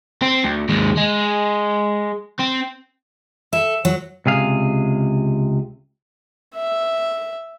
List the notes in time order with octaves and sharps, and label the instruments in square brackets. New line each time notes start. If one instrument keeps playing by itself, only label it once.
[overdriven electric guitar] C4
D2
D#2 G#3
G#3
C4
[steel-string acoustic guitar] A4 [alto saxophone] E5
[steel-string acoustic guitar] F#3
[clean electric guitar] C#2 C3 G#4 F5
[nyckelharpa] E5